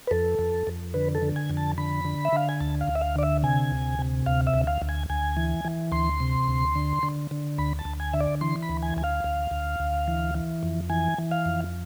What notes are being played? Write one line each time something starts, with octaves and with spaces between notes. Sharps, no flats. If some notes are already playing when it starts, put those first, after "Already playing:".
B4
F2 A4
F2
F2
D3 B4
A4
D3
G#5
F2
A5
D3 B5
D3
E5
D3 F5
G#5
D2 A5
F5
D2
E5
F5
D3 D5
E5
C3 G#5
D2
C3
D2 F5
E5
D2
F5
D2
G#5
D2 G#5
E3
E3
D2 C6
C3
D2
D3
D3
D3
D2 B5
A5
D2
G#5
D3 E5
D5
E3 C6
B5
D2
G#5
D2 G#5
F5
D2
D2
D2
E3
E3
F2
E3 G#5
E3
F5
F2